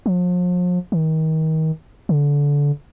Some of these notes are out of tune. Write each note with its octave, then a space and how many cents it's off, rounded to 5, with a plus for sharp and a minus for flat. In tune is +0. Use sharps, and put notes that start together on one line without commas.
F3 +40
D#3 +30
D3 -25